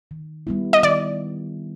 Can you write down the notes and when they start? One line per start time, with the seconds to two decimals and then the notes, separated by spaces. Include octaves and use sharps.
0.11 D#3
0.47 G3 B3 E4
0.73 D#5
0.83 D#3 D5